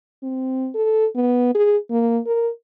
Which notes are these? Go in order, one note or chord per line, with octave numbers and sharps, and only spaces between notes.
C4
A4
B3
G#4
A#3
A#4